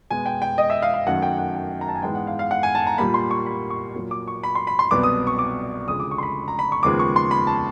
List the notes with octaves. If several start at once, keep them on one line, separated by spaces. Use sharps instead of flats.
B2 G#3 B3 G#5
G5
G5
D#5
E5
F5
F5
F#2 D#3 F#3 A3 F#5
G5
F#5
G5
A#5
A5
G#5
G#2 E3 G#3 B3 G5
F#5
F5
F5
F#5
G#5
A5
A#5
A#2 G3 A#3 B5
C6
C#6
B5
C#6
A#2 F#3 A#3
D6
C#6
B5
C6
B5
C6
C2 B2 F#3 B3 D6
D#6
C#6
D6
D2 C#3 F3 G#3 D#6
D6
C#6
C6
B5
A#5
B5
C#6
D#2 C#3 F3 G#3 B3 D6
C#6
C6
B5
A5